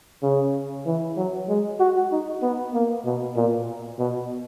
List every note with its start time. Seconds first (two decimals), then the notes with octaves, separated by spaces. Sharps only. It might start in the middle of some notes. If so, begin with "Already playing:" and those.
0.23 C#3
0.86 E3
1.17 F#3
1.49 G#3
1.80 F#4
2.12 D#4
2.42 B3
2.73 A#3
3.05 B2
3.36 A#2
3.99 B2